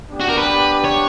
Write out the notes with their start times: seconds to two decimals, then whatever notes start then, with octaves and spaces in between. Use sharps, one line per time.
0.11 B3 D4 G4
0.20 F#4
0.29 A#4
0.38 B4
0.84 C#5